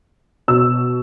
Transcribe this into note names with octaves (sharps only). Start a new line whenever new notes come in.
B2 E6